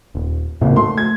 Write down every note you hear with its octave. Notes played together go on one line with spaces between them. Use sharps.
D#1
G#1 A2 C#3 A#3
A3 C6
G#6